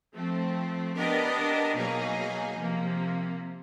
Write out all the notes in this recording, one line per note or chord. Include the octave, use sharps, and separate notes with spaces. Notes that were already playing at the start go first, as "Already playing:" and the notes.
F3 A3 C4
B3 D4 G4 A#4 D#5
B2 F#3 A#3 D#4 G#4
C3 F3 A#3